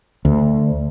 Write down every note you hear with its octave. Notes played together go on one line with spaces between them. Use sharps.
D2